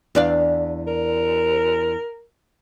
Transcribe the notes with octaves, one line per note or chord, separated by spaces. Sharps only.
E2 D4 F5
A#4